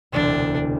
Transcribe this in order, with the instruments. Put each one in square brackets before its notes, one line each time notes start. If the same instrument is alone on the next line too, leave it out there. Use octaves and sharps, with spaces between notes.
[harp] E1 D2 C3 [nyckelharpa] D4